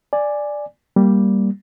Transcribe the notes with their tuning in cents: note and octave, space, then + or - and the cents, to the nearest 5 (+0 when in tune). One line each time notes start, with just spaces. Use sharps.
D5 +0 G#5 +0
G3 +0 A#3 +0